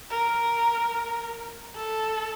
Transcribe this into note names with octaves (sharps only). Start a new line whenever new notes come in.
A#4
A4